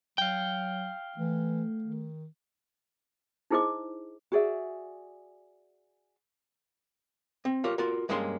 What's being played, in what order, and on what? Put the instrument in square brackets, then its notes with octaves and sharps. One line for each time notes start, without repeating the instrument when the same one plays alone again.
[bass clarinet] F#3 [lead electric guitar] F5 G5
[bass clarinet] E3 [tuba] A3
[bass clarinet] D#3
[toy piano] D#4 E4 G#4 C5 D#5 D6
[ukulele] F#4 G#4 D5 E5
[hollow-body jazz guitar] C4
F4 G4 A#4 C#5
F4 F#4 A#4
G2 G#3 A#3 C#4 F#4 C6